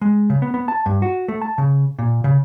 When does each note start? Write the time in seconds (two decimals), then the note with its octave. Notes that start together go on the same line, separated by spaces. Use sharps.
0.01 G#3
0.30 C#3
0.42 B3
0.54 B3
0.68 A5
0.86 G2
1.02 F#4
1.28 A3
1.42 A5
1.58 C#3
1.99 A#2
2.24 C#3